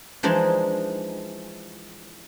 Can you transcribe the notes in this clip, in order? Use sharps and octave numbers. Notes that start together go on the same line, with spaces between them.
E3 F3 G#3 D4 D#4